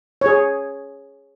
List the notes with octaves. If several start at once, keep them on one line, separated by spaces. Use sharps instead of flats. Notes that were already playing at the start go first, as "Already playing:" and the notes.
G#4 C#5